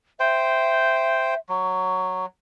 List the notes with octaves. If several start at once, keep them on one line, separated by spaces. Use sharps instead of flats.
C5 E5 G5
F#3 C#6